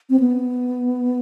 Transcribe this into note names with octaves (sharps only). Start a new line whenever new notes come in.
C4
B3